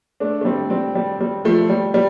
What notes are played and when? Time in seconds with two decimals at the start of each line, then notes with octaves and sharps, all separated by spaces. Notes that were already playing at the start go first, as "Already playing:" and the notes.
0.20 A3 D4
0.41 A3
0.45 G3 C4
0.70 G3 C4
0.95 G3
1.21 G3
1.45 F3 A3
1.70 G3
1.94 G3